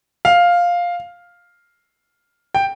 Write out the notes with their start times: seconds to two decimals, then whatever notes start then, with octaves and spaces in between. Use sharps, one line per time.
0.25 F5
2.55 G5